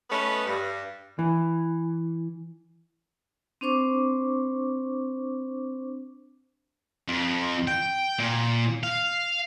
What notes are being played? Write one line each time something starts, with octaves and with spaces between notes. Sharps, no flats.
A3 B3 C#4 B4 D#5
G2
E3
C4 D4 C5 C#6 D6
F2
G5
A#2
F5